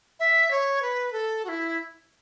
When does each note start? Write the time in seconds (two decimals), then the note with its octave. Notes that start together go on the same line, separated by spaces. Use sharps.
0.20 E5
0.51 C#5
0.82 B4
1.13 A4
1.45 F#4
1.48 E4